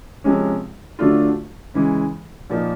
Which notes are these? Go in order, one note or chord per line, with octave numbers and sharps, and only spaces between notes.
C3 F3 G#3 C#4
D3 F#3 A3 D4 F4
C#3 E3 G#3
A#2 F3 A#3 D#4